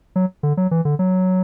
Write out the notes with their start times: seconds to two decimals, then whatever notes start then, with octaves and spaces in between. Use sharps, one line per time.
0.16 F#3
0.43 D3
0.57 F#3
0.71 E3
0.85 D3
0.99 F#3